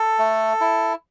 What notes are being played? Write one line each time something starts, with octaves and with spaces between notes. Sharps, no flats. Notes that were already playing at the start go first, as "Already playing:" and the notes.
Already playing: A4
A3
E4